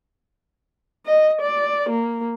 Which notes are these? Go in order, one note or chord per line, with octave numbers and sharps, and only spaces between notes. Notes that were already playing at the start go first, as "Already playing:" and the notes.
D#5
D5
A#3